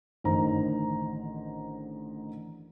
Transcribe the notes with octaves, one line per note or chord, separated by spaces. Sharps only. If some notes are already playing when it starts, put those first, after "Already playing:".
A1 D3 D#3 D#4 C5 A#5